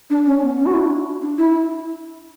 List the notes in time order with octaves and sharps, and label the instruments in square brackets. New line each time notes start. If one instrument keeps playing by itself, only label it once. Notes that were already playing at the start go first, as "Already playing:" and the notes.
[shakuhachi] D4
C#4
B3
C#4
F#4
E4
D4
D4
E4